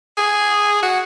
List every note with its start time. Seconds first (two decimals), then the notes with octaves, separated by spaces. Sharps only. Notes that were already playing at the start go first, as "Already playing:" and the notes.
0.17 G#4
0.83 F#4